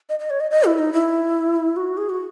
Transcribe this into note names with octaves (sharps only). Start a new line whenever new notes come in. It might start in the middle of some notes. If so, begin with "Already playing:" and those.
D#5
D#5
C#5
D#5
D#5
E4
D#4
E4
F#4
G#4
F#4